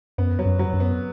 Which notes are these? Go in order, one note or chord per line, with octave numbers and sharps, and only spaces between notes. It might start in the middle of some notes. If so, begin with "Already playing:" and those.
F#2 B3
F#3
F#2
F#3
F#2
B3